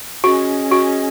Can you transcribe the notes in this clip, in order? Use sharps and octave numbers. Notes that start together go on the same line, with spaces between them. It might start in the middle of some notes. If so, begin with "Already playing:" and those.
C#4 F#4 G#4 D#5
F#4